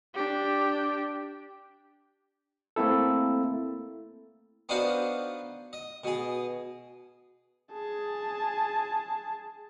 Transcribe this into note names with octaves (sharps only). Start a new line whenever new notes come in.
D4 G4
A3 A#3 C4 E4 A4
B3 D4 D#4 F#4 C5 F5
D#5
B2 G#4
G#4 A5